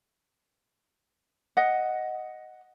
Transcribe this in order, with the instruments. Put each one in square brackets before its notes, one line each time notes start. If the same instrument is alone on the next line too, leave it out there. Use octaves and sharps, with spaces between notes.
[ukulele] D#5 F#5